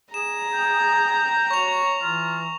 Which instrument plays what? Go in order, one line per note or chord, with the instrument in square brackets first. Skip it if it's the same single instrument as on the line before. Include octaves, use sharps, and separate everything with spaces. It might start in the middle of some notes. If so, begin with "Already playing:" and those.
[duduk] G#4 [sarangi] A#5 [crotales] E7
[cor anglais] G5
[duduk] F#4 [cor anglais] C#5 [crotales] C#6 F7
[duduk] E3 [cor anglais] F4